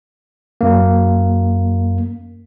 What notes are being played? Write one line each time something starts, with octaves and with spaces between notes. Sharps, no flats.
F#2 A#3